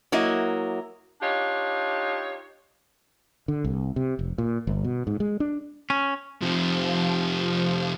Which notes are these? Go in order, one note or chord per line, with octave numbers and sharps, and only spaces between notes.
F#3 A#3 E4 D#5
D4 D#4 F4 G4 C#5
D3
C2
C3
F1
A#2
G1
B2
G#2
G#3
D4
C#4
F2 C3 F3